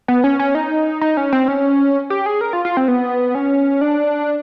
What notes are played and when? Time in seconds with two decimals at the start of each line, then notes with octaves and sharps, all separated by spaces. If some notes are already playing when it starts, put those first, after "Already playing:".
0.08 B3
0.24 C#4
0.39 C#4
0.55 D#4
1.01 D#4
1.17 C#4
1.32 C4
1.48 C#4
2.10 G4
2.26 G#4
2.41 A#4
2.53 F4
2.65 F4
2.77 C4
2.88 B3
3.35 C#4
3.81 D4